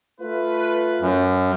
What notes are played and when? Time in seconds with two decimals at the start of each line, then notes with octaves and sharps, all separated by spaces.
0.21 A3 F4 B4
1.01 F#2